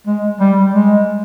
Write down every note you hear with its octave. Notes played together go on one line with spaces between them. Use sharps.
G#3
G3
G#3